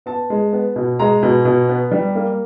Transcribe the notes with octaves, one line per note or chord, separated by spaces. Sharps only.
B3 A5
G#3
B3
B2
G#3 A#5
B2
B2
B3
G3
A#3